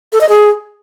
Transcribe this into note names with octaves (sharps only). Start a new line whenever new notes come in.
A4
D#5
G#4